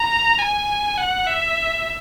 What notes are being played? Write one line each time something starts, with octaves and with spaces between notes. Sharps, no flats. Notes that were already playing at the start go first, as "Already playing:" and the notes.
Already playing: A#5
G#5
F#5
E5